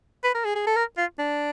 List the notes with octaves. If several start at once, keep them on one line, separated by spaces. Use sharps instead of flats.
B4
A#4
G#4
G#4
A4
A#4
F4
D4